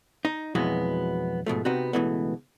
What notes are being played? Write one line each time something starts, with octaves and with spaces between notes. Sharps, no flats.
D#4
F2 B2 E3 F#3 G#3 B3
G#2 B2 F3 A3
C3 B3 C4 D#4 F#4
C#2 G#2 B2 E3 A3 B3